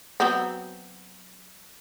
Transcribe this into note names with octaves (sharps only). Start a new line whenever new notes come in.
F#3 B3 C4